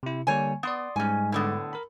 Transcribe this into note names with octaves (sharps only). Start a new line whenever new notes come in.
C3 E4
D3 G3 A#3 C#5 G#5
B3 D5 C6 D#6
G#2 G3 G#3 C#4 G#5
A2 D3 B3
A#4 B5